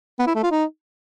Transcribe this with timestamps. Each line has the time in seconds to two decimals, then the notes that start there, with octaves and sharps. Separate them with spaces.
0.19 B3
0.27 E4
0.35 A3
0.43 F4
0.51 D#4